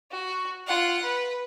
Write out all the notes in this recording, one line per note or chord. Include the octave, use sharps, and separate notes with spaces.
F#4
F4 F#5
B4